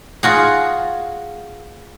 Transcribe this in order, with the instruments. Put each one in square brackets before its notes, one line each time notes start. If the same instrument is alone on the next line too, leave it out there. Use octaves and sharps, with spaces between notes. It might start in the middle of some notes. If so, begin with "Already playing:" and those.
[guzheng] F4 F#4 G#4